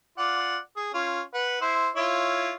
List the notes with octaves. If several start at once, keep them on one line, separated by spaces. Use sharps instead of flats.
F4 D5 F#5
G#4
C#4 F4
B4 F#5
E4 C5
E4 F4 C#5